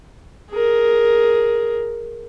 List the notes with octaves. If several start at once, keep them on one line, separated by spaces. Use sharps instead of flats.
G#4 A#4